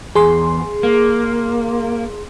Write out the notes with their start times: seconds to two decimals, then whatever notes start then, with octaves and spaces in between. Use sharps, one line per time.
0.15 E2 G#4 C6
0.83 A#3